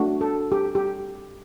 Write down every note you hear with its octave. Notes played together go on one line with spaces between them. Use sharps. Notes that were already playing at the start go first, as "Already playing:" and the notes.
Already playing: A3 D4 F#4
A4
G4
G4